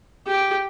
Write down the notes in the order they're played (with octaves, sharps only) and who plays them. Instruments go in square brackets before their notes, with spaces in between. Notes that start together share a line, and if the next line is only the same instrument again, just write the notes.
[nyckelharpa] G4